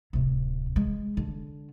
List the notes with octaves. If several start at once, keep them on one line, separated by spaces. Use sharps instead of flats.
D1 C3
G#3
D3